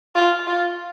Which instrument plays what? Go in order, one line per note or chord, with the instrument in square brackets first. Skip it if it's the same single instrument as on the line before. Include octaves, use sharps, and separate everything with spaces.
[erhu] F4
F4